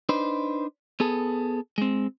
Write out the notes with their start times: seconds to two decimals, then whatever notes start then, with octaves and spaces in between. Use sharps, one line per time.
0.09 D4 D#4 B4 C5
1.00 B3 G#4 A4
1.78 G#3 C4